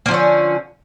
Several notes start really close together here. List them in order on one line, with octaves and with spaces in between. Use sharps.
A#3 F3 D3 C#4